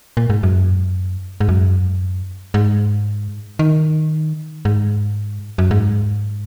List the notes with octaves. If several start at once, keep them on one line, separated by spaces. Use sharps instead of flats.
A#2
G#2
F#2
G#2
F#2
G#2
D#3
G#2
F#2
G#2